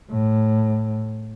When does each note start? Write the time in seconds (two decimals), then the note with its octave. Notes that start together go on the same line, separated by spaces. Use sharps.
0.11 A2